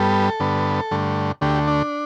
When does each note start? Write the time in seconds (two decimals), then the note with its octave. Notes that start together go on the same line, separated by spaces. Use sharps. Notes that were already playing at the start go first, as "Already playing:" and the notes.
Already playing: G2 G3 B3 A4
0.40 G2 D3 B3
0.91 G2 D3 A3
1.41 D2 D3 A3 G4
1.67 D4